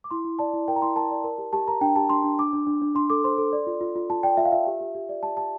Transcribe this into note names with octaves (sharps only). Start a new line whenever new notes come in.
D6
E4 C6
E4
D5 A5
E4
A#4 G5
A#5
E4 C6
A#4 A5
D5
A#4
G4
G4 A5
A#4 A#5
D4 G5
G4 A5
D4 C6
D4
D4 D6
D4
D4
D4
D4 C6
A4 D6
C5 C6
A4
D5
F4
F4
F4
F4 A5
D5 G5
F4 E5
F5
F4 E5
G4
G4
G4
D5
G4 A5
G4 A5